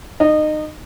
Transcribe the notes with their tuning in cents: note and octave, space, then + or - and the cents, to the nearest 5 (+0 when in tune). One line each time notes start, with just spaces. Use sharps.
D#4 -25